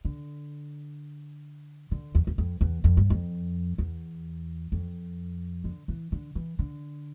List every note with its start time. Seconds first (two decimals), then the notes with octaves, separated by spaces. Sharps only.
0.05 D3
1.91 D3
2.15 E2
2.27 E2
2.38 F2
2.61 E2
2.84 F2
2.97 G2
3.10 F2
3.78 E2
4.72 F2
5.64 D3
5.88 E3
6.12 D3
6.35 E3
6.59 D3